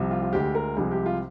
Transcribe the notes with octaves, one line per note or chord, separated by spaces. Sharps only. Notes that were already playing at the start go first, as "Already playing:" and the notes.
Already playing: C2 C3 F3
F4
F4
D2 D3 G#3 G4
A#4
C2 C3 F3 G#3 G#4
G4
F4